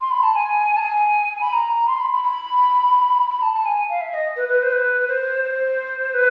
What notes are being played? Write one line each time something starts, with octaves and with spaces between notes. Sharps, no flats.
C6
B5
A5
G#5
A5
G#5
B5
A#5
C6
B5
B5
B5
B5
A5
A5
G#5
F5
E5
D#5
B4
B4
C5
B4
C5
C5
B4